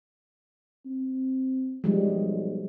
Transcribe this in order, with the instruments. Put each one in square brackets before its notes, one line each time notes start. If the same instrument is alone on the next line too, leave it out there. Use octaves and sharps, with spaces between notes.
[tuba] C4
[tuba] B1 [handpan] F3 G3 G#3